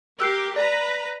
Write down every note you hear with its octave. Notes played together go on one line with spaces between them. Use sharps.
G4 A#4 E6 F#6 C7
B4 D5 A#5 B5